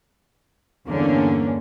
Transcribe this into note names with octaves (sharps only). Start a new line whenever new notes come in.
E2 G2 D3 A#3 C#4